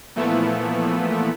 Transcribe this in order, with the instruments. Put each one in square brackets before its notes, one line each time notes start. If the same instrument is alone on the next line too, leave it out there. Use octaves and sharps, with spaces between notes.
[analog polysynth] A#2 E3 F3 A3 B3 E4